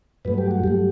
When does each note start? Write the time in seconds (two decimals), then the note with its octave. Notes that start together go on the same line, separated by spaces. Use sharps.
0.25 G2 F#3 A3 B4
0.38 G4
0.51 F#4
0.64 G2 F#3 A3 G4